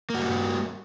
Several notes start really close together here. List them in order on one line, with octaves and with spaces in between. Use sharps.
A#3 F#4 G3